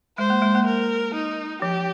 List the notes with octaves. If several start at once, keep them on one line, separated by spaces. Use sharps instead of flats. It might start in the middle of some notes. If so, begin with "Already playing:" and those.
G#3 C5
A#3
G#3
A#3
A#4
D#4
F3 G4